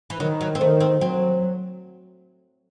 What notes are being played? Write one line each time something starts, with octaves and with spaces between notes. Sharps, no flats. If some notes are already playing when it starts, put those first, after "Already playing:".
E3
D#3 F#3
F#3
C4
D#3 A3
C4
F#3 C4